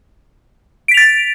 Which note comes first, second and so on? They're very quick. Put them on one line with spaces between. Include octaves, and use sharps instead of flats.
D7 B6 F7 A6